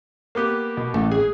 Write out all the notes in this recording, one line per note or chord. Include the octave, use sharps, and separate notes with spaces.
A#3 B3 G4
B2
A1 A3
G#4